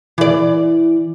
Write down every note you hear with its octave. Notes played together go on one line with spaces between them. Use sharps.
E3 D5